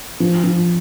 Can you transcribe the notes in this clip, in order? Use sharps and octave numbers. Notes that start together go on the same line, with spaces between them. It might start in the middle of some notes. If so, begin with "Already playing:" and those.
F3
F3